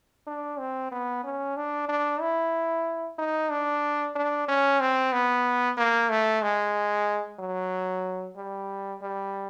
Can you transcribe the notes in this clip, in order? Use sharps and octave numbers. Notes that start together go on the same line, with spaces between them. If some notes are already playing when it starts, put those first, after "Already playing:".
D4
C4
B3
C#4
D4
D4
E4
D#4
D4
D4
C#4
C4
B3
A#3
A3
G#3
F#3
G3
G3